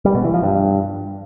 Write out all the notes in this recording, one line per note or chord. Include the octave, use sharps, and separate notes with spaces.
G3
B2
E3
F3
G2